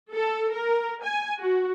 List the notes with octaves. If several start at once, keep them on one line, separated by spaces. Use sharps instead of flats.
A4
A#4
G#5
F#4